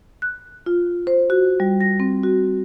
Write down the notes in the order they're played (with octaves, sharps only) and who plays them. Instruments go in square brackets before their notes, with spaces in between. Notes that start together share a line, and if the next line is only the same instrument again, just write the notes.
[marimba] F#6
F4
C5
F#4
G3
A#6
C4
F#4